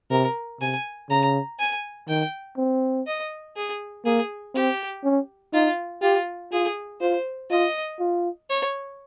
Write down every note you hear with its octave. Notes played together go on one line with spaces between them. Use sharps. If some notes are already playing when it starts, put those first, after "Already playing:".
C3 A#4
C3 G#5
C#3 A#5
G#5
D#3 G5
C4
D#5
G#4
A#3 G#4
C4 G4
C#4
D#4 F4
F4 G4
F4 G#4
F4 C5
F4 D#5
F4
C#5